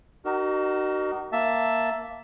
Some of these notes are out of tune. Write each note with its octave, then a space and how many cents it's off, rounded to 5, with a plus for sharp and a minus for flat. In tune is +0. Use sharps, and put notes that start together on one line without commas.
D#4 -30 F#4 +35 A#4 +0
A#3 +0 E5 +5 A5 +0